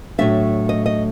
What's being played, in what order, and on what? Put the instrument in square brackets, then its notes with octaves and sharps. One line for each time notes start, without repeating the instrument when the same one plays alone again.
[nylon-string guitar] A2 F#3 A3 D4 E5
D#5
D#5